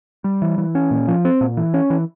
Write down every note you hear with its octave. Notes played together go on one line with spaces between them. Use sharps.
G3
E3
E3
C#4
A#2
F3
C4
A#2
E3
C#4
E3